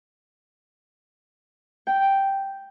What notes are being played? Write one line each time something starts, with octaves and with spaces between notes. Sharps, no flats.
G5